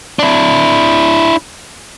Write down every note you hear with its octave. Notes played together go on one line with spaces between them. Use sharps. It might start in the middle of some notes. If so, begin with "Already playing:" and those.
D4 E4